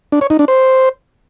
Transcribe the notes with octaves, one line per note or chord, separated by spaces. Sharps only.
D4
C#5
D#4
D4
C5